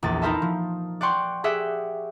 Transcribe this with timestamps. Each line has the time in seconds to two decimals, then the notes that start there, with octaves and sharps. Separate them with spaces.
0.03 A#1 E2 A6
0.22 D#4 E4 A#4 C5 E5 A5
0.42 F3
1.01 D5 F#5 G5 C6 C#6
1.44 G4 G#4 E5 F#5 G5